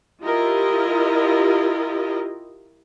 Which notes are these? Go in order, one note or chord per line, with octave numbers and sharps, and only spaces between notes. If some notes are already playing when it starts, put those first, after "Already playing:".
E4 F4 G4 A#4 D#5